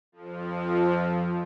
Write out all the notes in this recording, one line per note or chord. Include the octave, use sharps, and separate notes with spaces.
F2 F3